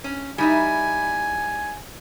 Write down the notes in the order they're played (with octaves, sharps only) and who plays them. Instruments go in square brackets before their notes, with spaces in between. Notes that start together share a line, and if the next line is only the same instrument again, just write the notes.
[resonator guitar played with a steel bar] C#4
[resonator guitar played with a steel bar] G3 D#4 E4 [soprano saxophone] G#5